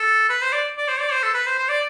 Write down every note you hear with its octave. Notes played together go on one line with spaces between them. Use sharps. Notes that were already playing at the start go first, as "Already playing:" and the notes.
Already playing: A4
B4
C5
D5
D5
C5
D5
C5
A4
B4
C5
C5
D5